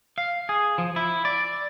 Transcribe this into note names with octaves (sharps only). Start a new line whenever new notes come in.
F5
G#4
F3
E4
D5